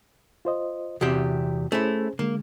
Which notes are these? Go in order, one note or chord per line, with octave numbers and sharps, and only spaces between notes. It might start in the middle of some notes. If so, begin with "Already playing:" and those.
F4 C5 D#5
E2 C3 F#4 G4
A3 C#4 E4 G#4 C5
D3 G#3 A#3